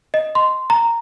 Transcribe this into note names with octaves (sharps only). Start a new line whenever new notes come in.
D#5
C6
A#5